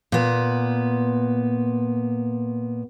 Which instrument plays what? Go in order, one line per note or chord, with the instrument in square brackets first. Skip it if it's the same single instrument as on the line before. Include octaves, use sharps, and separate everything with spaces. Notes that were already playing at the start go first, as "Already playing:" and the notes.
[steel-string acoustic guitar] A#2 B3